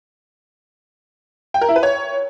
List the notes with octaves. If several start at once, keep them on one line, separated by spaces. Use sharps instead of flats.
G5
A#4
E4
B4
C#5